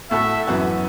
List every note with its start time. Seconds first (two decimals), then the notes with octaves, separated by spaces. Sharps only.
0.11 A2 A3 F#4 A4 E5
0.47 F#2 E3 B3 F#4